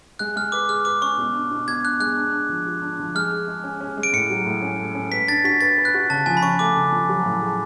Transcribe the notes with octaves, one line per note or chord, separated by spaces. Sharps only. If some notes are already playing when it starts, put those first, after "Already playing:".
G#3 F#6
G#3 F6
B4 D6
G#4 F6
B4 D6
C#4 C#6
B2
D4
B2
B2 G#6
D4 F#6
G#3 F#6
D4
D4
F3
F4
D4
F3
G#3 F6
G#4
G#3
C#4
C#4
G#3
D7
A2 C#7
F#3
A2
C#4
A3
C#4
B4 B6
D4 A6
F#4 B6
B4 A6
B4
F#6
F#4
C#3 A5
F3 G#5
B5
C#4 C#6
A3 D6
C#3
F3
F#3
A2
G#4